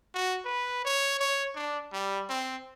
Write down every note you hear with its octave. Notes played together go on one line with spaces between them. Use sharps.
F#4
B4
C#5
C#5
D4
G3
C4